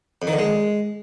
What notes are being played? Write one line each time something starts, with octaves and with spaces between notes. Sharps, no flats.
F2
D#3
D3
G#3